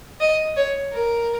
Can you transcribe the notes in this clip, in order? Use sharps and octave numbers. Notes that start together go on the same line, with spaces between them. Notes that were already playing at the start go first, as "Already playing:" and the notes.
D#5
C#5
A#4